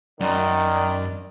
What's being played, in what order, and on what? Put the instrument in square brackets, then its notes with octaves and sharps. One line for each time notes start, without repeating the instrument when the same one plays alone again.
[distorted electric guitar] F#2 [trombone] D#3 [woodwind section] D5